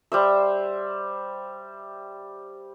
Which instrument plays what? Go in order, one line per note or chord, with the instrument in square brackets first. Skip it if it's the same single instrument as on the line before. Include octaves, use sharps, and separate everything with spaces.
[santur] G3 C5 E5